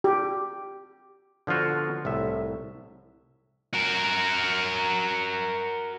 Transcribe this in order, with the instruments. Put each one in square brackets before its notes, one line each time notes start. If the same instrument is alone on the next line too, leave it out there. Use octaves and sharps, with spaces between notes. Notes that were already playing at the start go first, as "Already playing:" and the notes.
[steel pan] G4
[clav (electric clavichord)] D3 F3 B3 F4 F#4
C2 A2 E5
[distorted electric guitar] F#4 A#4